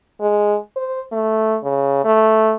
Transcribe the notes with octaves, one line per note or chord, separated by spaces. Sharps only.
G#3
C5
A3
C#3
A3